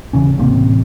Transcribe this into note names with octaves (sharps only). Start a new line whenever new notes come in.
D#2 C#3 E3 C#4
A1 C3 A#3 C4